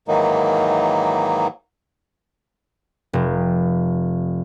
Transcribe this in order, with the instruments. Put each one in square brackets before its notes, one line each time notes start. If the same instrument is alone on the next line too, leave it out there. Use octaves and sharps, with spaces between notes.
[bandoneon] G#2 D#3 E3 F#3 A#3 D#4
[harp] F1